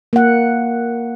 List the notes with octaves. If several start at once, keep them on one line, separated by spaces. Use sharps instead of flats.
A#3 F#5